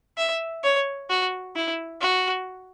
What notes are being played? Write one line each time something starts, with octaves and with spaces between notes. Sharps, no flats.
E5
C#5
F#4
E4
F#4